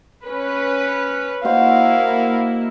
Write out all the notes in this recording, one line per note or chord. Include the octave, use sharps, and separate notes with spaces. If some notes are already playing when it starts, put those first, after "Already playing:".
C#4 B4
A#3 E4 F#4 C5 D#5 F5